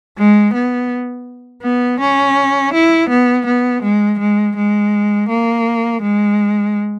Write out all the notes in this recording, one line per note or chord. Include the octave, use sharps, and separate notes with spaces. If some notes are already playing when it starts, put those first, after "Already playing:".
G#3
B3
B3
C#4
E4
B3
B3
G#3
G#3
G#3
A#3
G#3